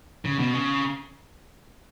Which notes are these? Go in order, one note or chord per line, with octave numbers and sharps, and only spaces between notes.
C#3
B2
C#3